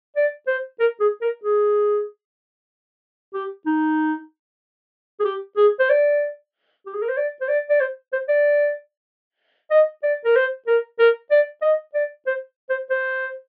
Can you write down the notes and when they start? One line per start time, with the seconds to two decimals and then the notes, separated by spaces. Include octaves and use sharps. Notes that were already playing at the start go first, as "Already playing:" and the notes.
0.16 D5
0.47 C5
0.80 A#4
1.00 G#4
1.21 A#4
1.44 G#4
3.34 G4
3.66 D#4
5.20 G#4
5.25 G4
5.57 G#4
5.79 C5
5.90 D5
6.86 G4
6.94 G#4
7.02 A#4
7.09 C5
7.17 D5
7.41 C5
7.48 D5
7.70 D5
7.81 C5
8.13 C5
8.28 D5
9.71 D#5
10.03 D5
10.25 A#4
10.36 C5
10.67 A#4
10.99 A#4
11.31 D5
11.62 D#5
11.94 D5
12.27 C5
12.69 C5
12.90 C5